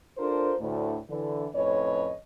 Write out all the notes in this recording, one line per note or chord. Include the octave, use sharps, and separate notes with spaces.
D4 F4 A4 A#4 C5
D2 A2
D3 E3
F2 A2 C#4 B4 C#5 D#5